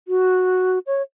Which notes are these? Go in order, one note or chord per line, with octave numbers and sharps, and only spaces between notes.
F#4
C#5